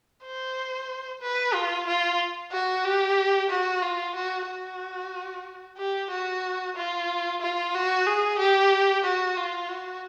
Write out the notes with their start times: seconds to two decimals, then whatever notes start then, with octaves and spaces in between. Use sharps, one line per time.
0.24 C5
1.22 B4
1.54 F4
1.87 F4
2.52 F#4
2.85 G4
3.50 F#4
3.82 F4
4.16 F#4
4.47 F#4
5.78 G4
6.11 F#4
6.77 F4
7.42 F4
7.74 F#4
8.07 G#4
8.39 G4
9.04 F#4
9.37 F4
9.69 F#4